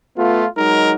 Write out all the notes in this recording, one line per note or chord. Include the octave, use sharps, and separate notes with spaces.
A3 B3 F4
F#3 G#3 D#4 A#4